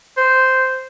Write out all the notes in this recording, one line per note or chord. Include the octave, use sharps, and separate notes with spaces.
C5